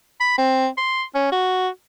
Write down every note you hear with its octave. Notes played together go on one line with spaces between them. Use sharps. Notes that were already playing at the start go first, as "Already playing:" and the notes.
B5
C4
C6
C#4
F#4